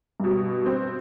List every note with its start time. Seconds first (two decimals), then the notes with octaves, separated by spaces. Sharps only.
0.20 G2 B2
0.66 C4